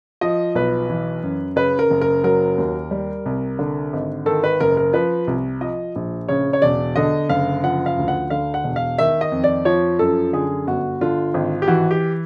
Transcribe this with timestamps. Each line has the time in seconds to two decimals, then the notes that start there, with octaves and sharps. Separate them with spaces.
0.21 F3 D#5
0.55 B1 B4
0.90 E3
1.23 F#2
1.56 C#3 B4
1.79 A#4
1.90 F#1
2.01 A#4
2.24 F#3 A#4
2.58 D#2
2.91 G3
3.26 C2
3.59 D3
3.93 G#1
4.26 D#3 A4
4.44 B4
4.60 F#1 A#4
4.77 A#4
4.93 F3 B4
5.27 C2
5.61 F3 D#5
5.96 A#1
6.28 C#3 C#5
6.53 C#5
6.62 E1 D5
6.96 D3 D#5
7.29 F#1 F5
7.63 F3 F#5
7.86 F5
7.98 D2
8.08 F#5
8.30 D3 F5
8.54 F#5
8.64 E1
8.76 F5
8.98 D#3 E5
9.21 D#5
9.32 F2
9.44 D5
9.65 F3 C#5
9.99 F#2 A4
10.33 D3 G#4
10.67 G1 F#4
11.01 D3 F4
11.34 G#1
11.62 G4
11.68 E3 F#4
11.91 G4